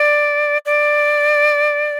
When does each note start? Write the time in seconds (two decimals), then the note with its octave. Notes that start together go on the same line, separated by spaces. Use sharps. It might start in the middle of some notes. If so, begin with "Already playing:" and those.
Already playing: D5
0.66 D5